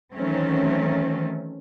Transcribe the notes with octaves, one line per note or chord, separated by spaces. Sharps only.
D#3 E3 F#3 A3 C4 C#4